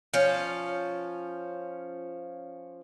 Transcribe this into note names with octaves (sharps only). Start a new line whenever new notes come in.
F3 C#4